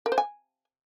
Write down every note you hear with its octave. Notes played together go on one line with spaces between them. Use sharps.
A#4
C5
G#5